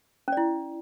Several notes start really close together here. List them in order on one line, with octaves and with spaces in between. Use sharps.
C#4 D5 E4